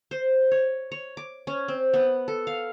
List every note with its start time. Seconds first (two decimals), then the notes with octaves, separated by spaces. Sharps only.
0.11 C5
0.51 C#5
0.92 C#5
1.17 D6
1.47 C#4
1.68 C4
1.94 B3
2.28 A4
2.47 F5